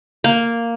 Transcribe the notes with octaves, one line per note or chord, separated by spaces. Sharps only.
A#3